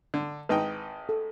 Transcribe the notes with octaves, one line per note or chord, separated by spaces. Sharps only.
D3
G#1 D#4 B4 G5
A4